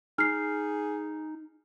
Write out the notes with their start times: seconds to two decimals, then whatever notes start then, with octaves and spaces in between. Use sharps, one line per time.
0.18 D#4 G#4 F6 C7